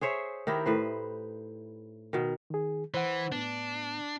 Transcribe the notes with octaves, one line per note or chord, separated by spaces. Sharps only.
G#4 C5 C#5 E5
D#3 D#4 E4 G4
A2 B4 C5
B2 D#3
D#3 G#4
E3 C5 F#5
A2 B3 D4